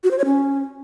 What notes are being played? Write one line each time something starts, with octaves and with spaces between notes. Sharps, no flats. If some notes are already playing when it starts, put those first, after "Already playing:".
F#4
C5
C#5
C#4